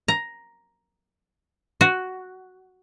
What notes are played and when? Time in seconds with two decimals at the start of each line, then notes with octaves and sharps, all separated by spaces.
0.08 A#5
1.81 F#4